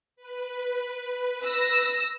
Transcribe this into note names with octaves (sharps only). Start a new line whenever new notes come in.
B4
E6 A#6